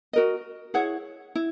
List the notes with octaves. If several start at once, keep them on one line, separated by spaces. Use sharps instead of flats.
F#4 A#4 D#5
E4 G#4 C#5 F#5
E4